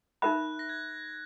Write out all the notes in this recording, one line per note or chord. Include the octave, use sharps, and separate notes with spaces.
D#4 A#4 E5 B5 F#6
A#6
G#6